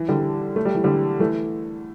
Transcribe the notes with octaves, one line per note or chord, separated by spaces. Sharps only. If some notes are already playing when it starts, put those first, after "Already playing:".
Already playing: E3
D3 G3
A3
G3
E3
D3 G3
E3 A3